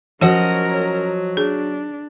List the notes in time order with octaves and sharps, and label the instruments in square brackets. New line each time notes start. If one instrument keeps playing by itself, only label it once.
[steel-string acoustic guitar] F3 D#5 F#5 [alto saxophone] F#3 [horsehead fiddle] C#4 A#4 [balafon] F#4
[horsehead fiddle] D4 [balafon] G#4